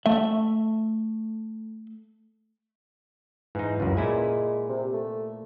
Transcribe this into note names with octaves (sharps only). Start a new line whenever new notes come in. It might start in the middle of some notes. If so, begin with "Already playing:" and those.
A3 E5
G#2 E3 D#4
C#2 F#2
A#2 G#3 E4 G#5
C3
A3